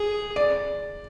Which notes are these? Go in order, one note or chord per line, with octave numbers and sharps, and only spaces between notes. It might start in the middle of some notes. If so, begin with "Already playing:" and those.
Already playing: G#4
D5